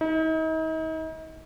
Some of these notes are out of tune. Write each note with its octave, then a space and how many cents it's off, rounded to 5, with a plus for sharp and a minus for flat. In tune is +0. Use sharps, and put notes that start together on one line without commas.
D#4 +40